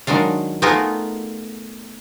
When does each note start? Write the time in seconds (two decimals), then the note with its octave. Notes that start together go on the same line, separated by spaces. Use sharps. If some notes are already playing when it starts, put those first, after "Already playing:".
0.07 D#3 F#3 G#3 D4 F5
0.62 A3 B3 D#4 F4 G#4 A#4